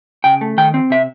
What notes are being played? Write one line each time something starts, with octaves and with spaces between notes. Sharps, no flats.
C#3 G5
A3
D#3 G5
C4
C3 E5